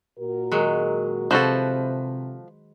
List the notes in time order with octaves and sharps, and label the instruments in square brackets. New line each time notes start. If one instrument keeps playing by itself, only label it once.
[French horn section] A#2 F#4 A#4
[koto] D#3 F#3 G#3
[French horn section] C3 [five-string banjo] F3 F#4 A4 [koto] B4 C5